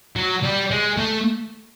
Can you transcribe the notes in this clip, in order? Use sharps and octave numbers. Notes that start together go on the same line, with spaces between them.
F#3
G3
G#3
A3